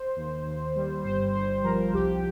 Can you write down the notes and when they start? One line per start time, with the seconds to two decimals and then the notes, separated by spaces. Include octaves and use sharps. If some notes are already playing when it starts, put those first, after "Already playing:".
Already playing: C5
0.16 D#2
0.45 D#2
0.76 G3
1.04 G1 C5
1.34 G1 C5
1.63 F3 A#4
1.93 C2 G4